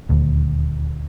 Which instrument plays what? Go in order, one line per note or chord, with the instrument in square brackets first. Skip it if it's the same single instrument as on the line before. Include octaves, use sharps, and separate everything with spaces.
[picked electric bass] D#1 D2